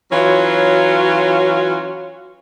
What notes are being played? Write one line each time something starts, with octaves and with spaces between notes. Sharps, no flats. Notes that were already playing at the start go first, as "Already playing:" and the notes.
E3 F#3 C#4 F4 F#4 C#5